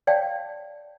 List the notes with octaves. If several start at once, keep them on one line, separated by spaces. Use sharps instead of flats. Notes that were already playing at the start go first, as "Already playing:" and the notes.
C#5 D5 E5 F5 G5 A5